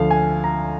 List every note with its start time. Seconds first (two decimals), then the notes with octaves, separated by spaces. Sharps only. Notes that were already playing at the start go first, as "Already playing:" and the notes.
Already playing: D2 D3 F3 F5
0.11 G#5
0.44 A#5